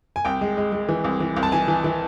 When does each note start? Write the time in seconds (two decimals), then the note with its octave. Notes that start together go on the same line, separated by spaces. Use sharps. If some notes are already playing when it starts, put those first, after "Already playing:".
0.16 G#5
0.25 C2 G5
0.41 G#3
0.57 G#3
0.72 G#3
0.89 E3
1.04 C2
1.20 E3
1.37 C2
1.43 A5
1.52 E3 G#5
1.68 E3
1.84 E3